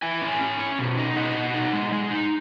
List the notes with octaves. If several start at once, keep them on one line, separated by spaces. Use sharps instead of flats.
E4 E5 G#5
C#4
C#4
C#4
B2
D#4
B2 D#5 F#5
B2
D#4
G#3
G#3
D#4